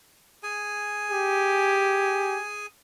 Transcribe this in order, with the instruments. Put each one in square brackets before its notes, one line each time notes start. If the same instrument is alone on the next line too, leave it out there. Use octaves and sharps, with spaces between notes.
[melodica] G#4 G#5
[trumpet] G4